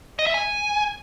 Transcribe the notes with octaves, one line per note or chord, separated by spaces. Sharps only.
D#5
E5
G#5